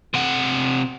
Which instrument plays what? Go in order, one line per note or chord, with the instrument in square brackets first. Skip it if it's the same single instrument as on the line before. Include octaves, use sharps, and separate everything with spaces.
[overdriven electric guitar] C3 F#5